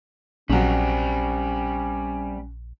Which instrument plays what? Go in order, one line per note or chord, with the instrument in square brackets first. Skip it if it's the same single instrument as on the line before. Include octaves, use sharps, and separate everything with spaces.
[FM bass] A#1 [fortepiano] C#3 F#3 [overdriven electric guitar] G3 C4 [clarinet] C#4